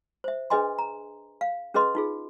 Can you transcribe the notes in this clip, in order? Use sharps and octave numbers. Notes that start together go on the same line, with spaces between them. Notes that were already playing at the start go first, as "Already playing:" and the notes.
C5 E5
D4 G#4 B4 D#5 G#5 C6
A#5
F5
C#4 G#4 B4 D#5 C6
D#4 F4 G#4